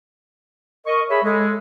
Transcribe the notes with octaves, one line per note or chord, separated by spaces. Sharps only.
A#4 D#5 C#6
G#4 C#5 E5 B5
G#3 A4